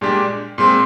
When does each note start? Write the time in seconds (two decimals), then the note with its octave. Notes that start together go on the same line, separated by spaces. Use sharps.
0.01 A#2 G#3 D4 G4
0.58 A#2 G#3 C4